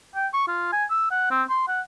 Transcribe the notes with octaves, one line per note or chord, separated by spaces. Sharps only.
G5
C#6
F4
G#5
E6
F#5
C4
C6
F#5